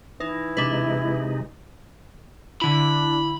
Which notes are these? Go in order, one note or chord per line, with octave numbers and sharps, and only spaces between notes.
E3 D#4 E4
C3 G#3 D4 D#4 B4
D3 D4 E4 B5